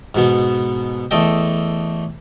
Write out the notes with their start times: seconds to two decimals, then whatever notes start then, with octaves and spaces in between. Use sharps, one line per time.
0.15 G#2 B2 B3
1.11 E2 A3 A4 D#5 G5